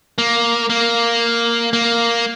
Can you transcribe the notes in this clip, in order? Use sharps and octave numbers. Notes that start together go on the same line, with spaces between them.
A#3
A#3
A#3